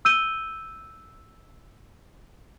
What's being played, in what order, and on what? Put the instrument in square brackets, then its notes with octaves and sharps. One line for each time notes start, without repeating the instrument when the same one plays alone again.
[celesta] E6 G6 D#7 G7